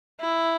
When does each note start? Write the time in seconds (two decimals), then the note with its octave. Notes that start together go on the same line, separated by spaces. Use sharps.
0.20 E4